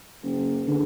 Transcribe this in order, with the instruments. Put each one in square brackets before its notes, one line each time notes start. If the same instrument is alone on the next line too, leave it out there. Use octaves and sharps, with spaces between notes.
[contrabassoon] F#1
[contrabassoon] E2 [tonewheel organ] D3